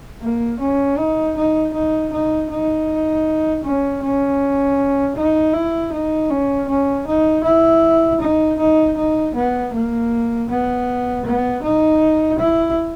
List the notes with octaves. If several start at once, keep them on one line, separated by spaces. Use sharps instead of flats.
A#3
C#4
D#4
D#4
D#4
D#4
D#4
C#4
C#4
D#4
E4
D#4
C#4
C#4
D#4
E4
D#4
D#4
D#4
B3
A#3
B3
B3
D#4
E4